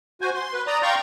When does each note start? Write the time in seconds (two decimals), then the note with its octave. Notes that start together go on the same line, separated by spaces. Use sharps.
0.21 F#4 C5 G#5
0.35 C6
0.53 B4
0.67 D5 A#5 D#6
0.83 F5 G5 A#5 C6 C#6 G6